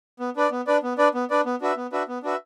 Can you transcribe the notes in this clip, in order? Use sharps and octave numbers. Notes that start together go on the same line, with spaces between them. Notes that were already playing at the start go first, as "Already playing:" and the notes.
B3
D4 B4 D5
B3
D4 B4 D5
B3
D4 B4 D5
B3
D4 B4 D5
B3
D4 F#4 B4 E5
B3
D4 F#4 B4 E5
B3
D4 F#4 B4 E5